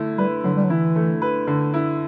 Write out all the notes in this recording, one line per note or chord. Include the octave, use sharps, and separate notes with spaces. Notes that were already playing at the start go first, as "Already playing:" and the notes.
Already playing: D3 A3 E4
G3 B4
D3 F#3
G3
F#3
E3 E4
A3
B4
D3
E4